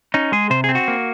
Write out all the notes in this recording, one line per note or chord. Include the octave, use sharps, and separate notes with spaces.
C#4 D#4
G#3 G#4
C3 C5
C4 G#4
F#4
A#3